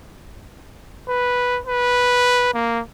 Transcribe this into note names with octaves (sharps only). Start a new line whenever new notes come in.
B4
B4
A#3